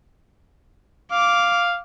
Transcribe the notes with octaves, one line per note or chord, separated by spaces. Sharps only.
F5 D6